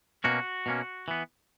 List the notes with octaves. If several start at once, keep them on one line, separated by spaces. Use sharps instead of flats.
B2 A#3 C#4 F#4
B2 A#3 C#4
E3 B3